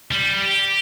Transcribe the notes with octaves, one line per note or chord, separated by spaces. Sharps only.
G3
G4